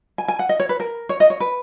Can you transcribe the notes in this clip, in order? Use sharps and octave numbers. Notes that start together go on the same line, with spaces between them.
G#5
G#5
F#5
D#5
C#5
B4
A#4
C#5
D#5
C#5
B4